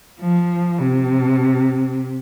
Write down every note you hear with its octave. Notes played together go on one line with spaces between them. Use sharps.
F3
C3